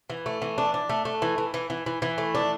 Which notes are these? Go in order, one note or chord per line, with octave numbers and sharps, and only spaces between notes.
E3
A3
E3
D4
D4
A3
A3
E3
E3
E3
E3
E3
E3
A3
D4